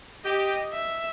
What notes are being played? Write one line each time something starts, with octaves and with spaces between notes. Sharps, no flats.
G4 D#5
E5